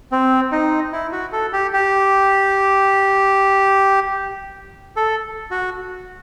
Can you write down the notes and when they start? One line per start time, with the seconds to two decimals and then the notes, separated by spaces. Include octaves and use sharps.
0.12 C4
0.52 D#4
0.92 E4
1.12 F#4
1.32 A4
1.53 G4
1.73 G4
4.97 A4
5.51 F#4